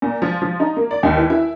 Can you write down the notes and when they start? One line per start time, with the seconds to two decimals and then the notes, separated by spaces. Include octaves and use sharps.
0.02 A#2
0.22 F3
0.42 F3
0.60 D#4
0.77 A#3
0.91 D5
1.03 D#2
1.16 E3
1.30 E4